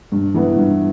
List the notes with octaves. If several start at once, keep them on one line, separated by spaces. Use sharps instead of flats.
G2
E3 B3
G2